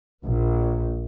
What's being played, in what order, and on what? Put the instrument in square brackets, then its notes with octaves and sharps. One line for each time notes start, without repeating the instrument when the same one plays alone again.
[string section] A#1